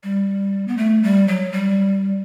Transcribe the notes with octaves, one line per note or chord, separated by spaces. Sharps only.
G3
B3
A3
G3
F#3
G3